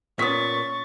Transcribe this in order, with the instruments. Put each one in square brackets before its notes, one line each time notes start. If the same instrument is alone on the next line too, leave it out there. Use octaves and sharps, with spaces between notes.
[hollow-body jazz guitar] A#2 B3 [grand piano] C#4 D#6 B6 [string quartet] C#6 A6